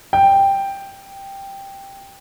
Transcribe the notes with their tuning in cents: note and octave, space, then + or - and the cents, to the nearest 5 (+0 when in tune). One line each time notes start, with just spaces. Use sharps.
G5 +5